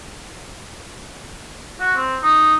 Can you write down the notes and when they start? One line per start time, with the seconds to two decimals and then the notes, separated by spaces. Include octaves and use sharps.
1.80 F#4
1.95 C4
2.23 D#4